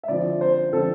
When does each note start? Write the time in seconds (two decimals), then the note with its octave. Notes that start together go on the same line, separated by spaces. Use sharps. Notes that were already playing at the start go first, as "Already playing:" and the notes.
0.03 E5
0.08 D3 F3 C4 D5
0.41 C5
0.72 D3 F3 C4 A4